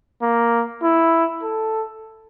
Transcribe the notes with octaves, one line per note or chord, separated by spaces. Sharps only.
A#3
E4
A4